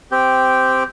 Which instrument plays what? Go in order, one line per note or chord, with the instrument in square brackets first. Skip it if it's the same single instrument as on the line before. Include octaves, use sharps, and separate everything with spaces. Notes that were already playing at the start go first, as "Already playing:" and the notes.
[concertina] C4 G4